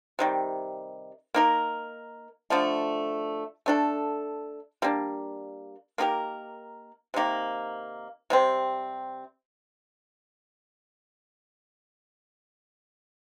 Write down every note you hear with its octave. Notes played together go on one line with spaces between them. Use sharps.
C3 D#3 G3
A#3 D#4 A#4
D3 F3 A3
A3 D4 A4
G3 A#3 D4
A#3 D#4 G4 A#4
C3 D#3 A#3
C3 G3 C4